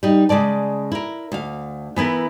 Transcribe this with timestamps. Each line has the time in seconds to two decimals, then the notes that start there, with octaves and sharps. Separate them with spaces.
0.03 G3 D#4
0.29 C#3 G#3 D5 A5
0.92 E4 A#4
1.32 D2 F5
1.96 E3 B3 E4 A#4